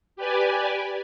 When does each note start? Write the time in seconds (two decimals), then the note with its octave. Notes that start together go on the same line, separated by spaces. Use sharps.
0.16 G4 B4 D5 G#5